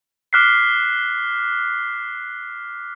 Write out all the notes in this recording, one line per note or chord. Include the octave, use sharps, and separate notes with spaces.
D6 F6 F#6 B6 C7